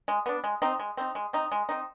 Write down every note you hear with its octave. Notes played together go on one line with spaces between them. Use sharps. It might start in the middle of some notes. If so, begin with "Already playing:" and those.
G#3
B3 D4
G#3
C4 D#4
G#3
C4 D#4
G#3
C4 D#4
G#3
C4 D#4